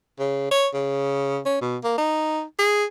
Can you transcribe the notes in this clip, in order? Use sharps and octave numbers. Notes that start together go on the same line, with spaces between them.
C#3
C#5
C#3
C#4
B2
A#3
D#4
G#4